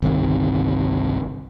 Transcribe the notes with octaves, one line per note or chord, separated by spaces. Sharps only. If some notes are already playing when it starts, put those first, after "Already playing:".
G1 C2 C3 D#3